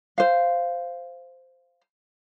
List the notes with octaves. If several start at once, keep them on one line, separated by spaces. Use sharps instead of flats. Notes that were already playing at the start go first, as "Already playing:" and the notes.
C5 F5